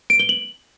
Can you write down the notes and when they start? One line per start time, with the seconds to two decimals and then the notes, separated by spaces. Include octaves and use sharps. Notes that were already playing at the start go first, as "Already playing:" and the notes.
0.10 D7
0.19 G7
0.29 F#7